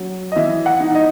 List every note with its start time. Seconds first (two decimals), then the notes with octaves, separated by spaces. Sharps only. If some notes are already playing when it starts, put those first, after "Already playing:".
Already playing: F#3 C#4
0.32 D#5
0.36 E3 E5
0.66 F#5
0.80 D#4
0.95 D#5